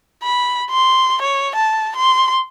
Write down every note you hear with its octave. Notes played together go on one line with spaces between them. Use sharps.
B5
C6
C#5
A5
C6